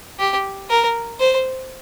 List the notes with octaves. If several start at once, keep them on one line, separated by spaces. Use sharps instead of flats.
G4
A#4
C5